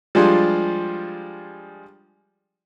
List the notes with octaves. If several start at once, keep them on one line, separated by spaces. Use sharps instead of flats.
F3 G3 G#3 D4 F4 G#4